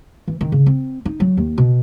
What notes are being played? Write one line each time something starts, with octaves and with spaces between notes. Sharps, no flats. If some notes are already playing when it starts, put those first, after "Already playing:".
E3
D#3
C#3
C4
D#4
F#3
D#2
B2